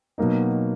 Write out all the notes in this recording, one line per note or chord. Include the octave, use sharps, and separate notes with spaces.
B2 F#3 A#3 D#4